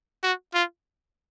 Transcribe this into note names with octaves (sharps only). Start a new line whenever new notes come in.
F#4
F4